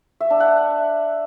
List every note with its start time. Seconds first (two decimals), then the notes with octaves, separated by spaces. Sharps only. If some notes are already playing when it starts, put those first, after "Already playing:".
0.20 E5
0.30 D4
0.40 F#5